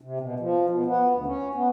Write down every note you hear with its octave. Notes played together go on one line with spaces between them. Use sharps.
C3
B2
F3
B2
B3
D2
C#4
B3